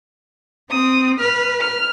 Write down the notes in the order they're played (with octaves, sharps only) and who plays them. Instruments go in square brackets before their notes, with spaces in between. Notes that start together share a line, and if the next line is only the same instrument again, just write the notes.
[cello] C4 [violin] D#6
[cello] B4 [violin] F6
[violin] F6